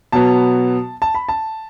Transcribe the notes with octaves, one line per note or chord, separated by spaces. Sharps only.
B2 F#3 B3 A5
A5
B5
A5